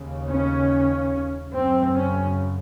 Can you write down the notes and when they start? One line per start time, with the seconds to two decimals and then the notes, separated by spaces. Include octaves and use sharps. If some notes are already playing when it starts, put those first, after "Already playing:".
Already playing: D#2 C#3
0.29 C#4
1.54 F#2 C#3 C4
1.97 C#4